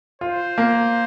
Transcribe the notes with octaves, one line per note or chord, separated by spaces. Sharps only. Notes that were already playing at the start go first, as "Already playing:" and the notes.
F4 C5
A#3